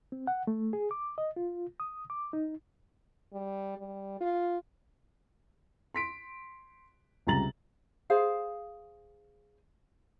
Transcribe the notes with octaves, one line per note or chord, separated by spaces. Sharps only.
C4
F#5
A3
G#4
D6
D#5
F4
D#6
D6
D#4
G3
G3
F4
C6 B6 D7
C#2 C3 G3 A#5 A6 F#7
G#4 C5 F5